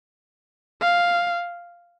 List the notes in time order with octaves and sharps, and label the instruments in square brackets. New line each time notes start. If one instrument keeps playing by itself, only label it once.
[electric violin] F5